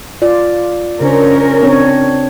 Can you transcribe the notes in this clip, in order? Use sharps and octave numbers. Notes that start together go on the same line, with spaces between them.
F4 D5
C#3 C#4 D4 A#4 C5
C4 D4 C#5